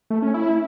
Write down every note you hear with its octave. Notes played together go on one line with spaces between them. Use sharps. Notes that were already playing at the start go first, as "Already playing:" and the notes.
A3
C#4
E4